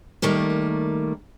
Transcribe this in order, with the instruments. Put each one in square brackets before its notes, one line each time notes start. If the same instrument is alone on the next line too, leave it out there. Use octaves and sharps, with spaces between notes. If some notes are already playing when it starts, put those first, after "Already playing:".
[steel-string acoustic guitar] D#3 G3 A3 A#3